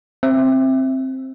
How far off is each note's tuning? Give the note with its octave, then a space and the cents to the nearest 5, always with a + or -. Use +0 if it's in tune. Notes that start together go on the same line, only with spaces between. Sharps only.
C4 +10 E5 +0